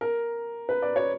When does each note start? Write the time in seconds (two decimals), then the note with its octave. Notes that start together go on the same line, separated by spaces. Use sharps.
0.01 A#4
0.69 B4
0.82 D5
0.96 C#5